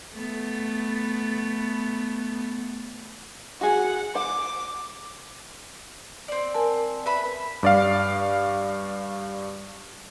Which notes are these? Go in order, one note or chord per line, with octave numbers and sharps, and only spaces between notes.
A3 B3
F#4 G#4 F#5
C5 F#5 D6
C4 D5
A#4 G#5 A5
B4 E5 B5
G2 D5 F5